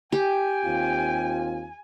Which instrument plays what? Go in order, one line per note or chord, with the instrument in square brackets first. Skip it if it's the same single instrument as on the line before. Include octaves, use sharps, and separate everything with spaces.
[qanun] G4 [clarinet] G5 [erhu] G#5
[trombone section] D#2 C4 F4